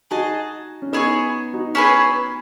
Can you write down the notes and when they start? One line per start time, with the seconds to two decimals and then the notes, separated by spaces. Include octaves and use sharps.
0.11 D#4 F#4 G#4 D#5 A5
0.82 C#4
0.93 B3 D#4 E4 G#4 C#5
1.53 D#4 F#4
1.75 C#4 E4 G#4 B4